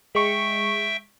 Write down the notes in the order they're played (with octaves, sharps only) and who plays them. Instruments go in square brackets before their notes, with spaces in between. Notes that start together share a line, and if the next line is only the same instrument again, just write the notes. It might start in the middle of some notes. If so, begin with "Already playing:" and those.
[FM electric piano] G#3 C#6 [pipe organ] E5 G5